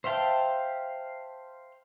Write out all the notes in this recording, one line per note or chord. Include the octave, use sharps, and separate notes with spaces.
C5 E5 F5 G5 A5